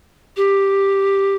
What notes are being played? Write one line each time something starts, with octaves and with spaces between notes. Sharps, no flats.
G4